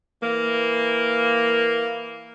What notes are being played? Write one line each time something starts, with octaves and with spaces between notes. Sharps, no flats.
E3 A#3